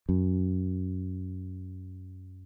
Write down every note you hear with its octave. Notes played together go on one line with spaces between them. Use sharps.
F#2